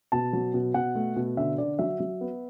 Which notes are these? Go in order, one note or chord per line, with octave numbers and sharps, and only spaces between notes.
B2 A5
F#3
B2
B2 F#5
A3
B2
D3 E5
D3 D5
F#3 E5
F#3
B3